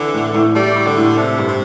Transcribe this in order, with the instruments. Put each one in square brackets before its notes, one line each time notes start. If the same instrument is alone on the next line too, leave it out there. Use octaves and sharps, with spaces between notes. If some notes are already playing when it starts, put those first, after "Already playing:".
Already playing: [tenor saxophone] D3 [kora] E3 C4 E4
[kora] A2
A2
[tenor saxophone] G3 [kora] A3
[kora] E4
[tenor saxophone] D3
[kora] A2
[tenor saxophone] C3 [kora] D4
[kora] G2
[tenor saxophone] C3